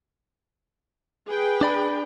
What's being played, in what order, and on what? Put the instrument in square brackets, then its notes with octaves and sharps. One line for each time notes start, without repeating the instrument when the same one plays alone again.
[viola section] G#4 B4 G5
[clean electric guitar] D4 D5 B5